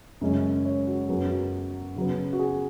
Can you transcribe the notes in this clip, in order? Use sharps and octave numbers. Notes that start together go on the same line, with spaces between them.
F#2 C#3 G#3 C#4
C#5
F#4
F#2 F#3 B3 G#4
F#4
C#3 F#3 B3
F#4
G#4